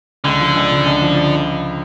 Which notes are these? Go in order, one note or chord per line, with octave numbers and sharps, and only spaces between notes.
C#2 D3
F3
C#2
C#3
C#2
F3